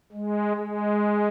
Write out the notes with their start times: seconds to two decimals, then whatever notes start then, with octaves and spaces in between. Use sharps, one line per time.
0.12 G#3
0.56 G#3